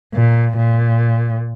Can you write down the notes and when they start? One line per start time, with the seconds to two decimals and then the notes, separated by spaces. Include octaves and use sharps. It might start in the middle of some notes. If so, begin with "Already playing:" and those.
0.14 A#2
0.58 A#2